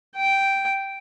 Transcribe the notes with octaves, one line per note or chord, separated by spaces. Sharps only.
G5